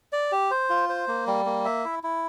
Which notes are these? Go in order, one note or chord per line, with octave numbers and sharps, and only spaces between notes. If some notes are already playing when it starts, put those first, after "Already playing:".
D5
G4
C5
F4
C5
A#3
G3
A#3
E5
E4
E4